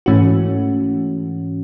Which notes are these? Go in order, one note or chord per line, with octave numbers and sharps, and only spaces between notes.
G#2 E3 A3 C#4 F#4